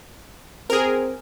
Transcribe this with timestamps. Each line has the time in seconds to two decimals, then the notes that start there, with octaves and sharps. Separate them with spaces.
0.70 C4 G#4 A#4